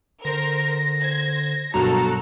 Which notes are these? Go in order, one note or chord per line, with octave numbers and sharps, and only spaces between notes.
D3 A#4 C5 A#6
C5 G#6
G1 B2 F#3 F#4 A4 A#4 A#5